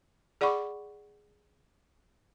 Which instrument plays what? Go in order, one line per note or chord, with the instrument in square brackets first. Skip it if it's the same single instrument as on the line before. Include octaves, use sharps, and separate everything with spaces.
[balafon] G#4 D5 F#5 B5 C#6 D6